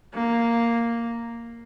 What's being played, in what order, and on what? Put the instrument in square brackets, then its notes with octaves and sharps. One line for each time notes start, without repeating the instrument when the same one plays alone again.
[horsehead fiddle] A#3